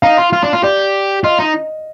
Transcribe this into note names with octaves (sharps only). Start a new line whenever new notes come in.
D#4 F5
F4
F4
D4
F4
G4 D5
F4 D#5
D#4